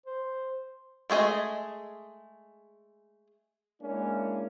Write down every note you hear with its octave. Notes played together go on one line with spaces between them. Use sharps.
C5
G#3 A3 G#4 D#5
G#3 A#3 C#4 D4 E4